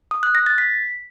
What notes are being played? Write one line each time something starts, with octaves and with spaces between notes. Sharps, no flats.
D#6
F#6
A#6
A6
B6